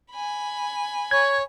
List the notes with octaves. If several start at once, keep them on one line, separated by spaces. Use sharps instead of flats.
G#5 B5
C#5 G#6